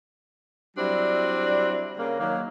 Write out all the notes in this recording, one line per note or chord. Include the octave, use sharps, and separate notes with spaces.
F#3 G3 C4 D4 E4
C#3 A#3
D#3 F#3 A#3